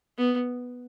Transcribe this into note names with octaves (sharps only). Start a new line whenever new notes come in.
B3